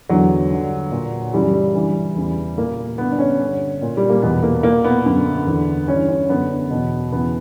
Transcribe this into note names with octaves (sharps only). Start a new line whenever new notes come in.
E2 D3 F#3
G2 D3
A#2
F#2 C#3 E3 G3
G3
G2 E3
E2 C#3 E3
A#2 A#3
G2 D3 B3
D4
C#4
G2 D3
A#2
G3
A#3
E2 B2 B3
A#3
A#2 A#3
B3
F#2 D3
E2 D3
G2 E3 C#4
C#4
F#2 D3 B3
E2 B2
E2 C#3 E3 B3